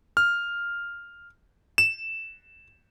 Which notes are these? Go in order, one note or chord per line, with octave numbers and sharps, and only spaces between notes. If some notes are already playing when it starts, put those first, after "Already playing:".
F6
E7